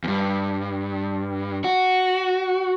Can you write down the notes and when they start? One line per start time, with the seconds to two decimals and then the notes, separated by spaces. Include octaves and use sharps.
0.04 E2 G2
1.64 F#4